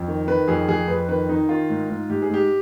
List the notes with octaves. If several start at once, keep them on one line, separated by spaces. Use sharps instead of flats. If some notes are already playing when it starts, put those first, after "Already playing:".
Already playing: F2
D#3
D#3 B4
F2 G#4
F2 G#4
F2 B4
D#3 B4
D#3 D#4
D#3 F4
G#2
G#2
G#2 G4
G#4
G#2 G4